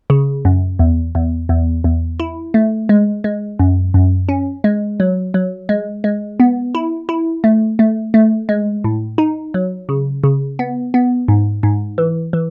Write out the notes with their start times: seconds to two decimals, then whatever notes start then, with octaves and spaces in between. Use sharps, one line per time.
0.10 C#3
0.45 F#2
0.79 E2
1.15 E2
1.49 E2
1.84 E2
2.20 E4
2.54 A3
2.89 G#3
3.24 G#3
3.59 F#2
3.94 F#2
4.29 C#4
4.64 G#3
5.00 F#3
5.34 F#3
5.69 G#3
6.04 G#3
6.40 B3
6.75 E4
7.09 E4
7.44 A3
7.79 A3
8.14 A3
8.49 G#3
8.84 A2
9.18 D#4
9.54 F#3
9.89 C#3
10.24 C#3
10.59 B3
10.94 B3
11.28 G#2
11.63 G#2
11.98 E3
12.33 E3